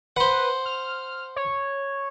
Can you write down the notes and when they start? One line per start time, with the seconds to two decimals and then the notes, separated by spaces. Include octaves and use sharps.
0.16 B4 C5 F#5
0.66 F6
1.36 C#5